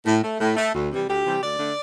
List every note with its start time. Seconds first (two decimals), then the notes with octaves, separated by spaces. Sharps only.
0.06 A2
0.24 A3
0.40 A2
0.57 A3
0.75 D2
0.92 C3 E3 G3
1.08 D2 G4
1.25 C3 E3 G3
1.42 D2 D5
1.59 D3 A3